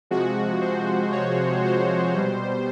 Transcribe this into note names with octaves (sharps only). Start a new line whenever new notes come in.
C3 F3 G#3 F#4
C5
C#5
C5
B2 G3